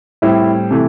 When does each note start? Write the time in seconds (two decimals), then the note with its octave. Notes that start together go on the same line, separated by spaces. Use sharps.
0.22 A2 G3 C4 E4
0.71 C3 E3 A3